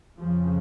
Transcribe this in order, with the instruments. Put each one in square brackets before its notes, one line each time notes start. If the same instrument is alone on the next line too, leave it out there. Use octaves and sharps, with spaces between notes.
[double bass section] F2 C#3 F3